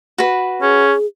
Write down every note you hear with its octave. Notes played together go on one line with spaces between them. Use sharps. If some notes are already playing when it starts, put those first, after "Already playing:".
F#4 B4
C#4 G#4